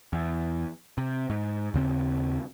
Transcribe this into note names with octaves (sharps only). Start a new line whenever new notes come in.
E2
C3
G#2
D#2 C#3 C4